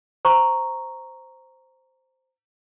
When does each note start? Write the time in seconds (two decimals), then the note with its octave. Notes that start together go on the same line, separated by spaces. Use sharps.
0.25 C5 A#5 C#6